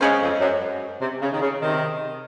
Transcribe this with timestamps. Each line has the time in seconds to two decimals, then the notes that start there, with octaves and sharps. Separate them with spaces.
0.01 C#3 G#3 C#4 G#4 C5
0.21 F2
0.41 F#2
1.01 C3
1.22 C#3
1.32 D#3
1.42 C#3
1.61 C3 D#3